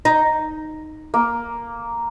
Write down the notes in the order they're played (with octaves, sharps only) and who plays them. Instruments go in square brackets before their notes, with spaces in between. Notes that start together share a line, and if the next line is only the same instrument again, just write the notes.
[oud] D#4
[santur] A#3